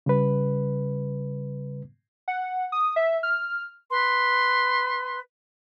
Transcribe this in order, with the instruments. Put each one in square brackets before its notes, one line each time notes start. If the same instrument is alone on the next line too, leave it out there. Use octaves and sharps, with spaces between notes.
[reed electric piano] C#3 G3 B4
[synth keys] F#5
D#6
E5
F6
[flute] B4 [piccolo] C6